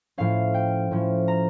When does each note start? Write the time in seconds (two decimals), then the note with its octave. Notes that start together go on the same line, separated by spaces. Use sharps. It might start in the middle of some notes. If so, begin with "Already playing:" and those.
0.18 A2 F3 C#4 F5
0.54 G5
0.91 A2 F3 C#4
1.28 A#5